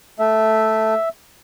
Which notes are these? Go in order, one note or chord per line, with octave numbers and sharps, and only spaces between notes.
A3 E5